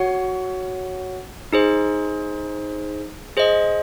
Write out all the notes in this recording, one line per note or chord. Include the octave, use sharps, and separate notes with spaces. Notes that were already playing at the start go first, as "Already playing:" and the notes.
Already playing: F#4 C#5 F#5
D#4 G#4 C5
G#4 C5 D#5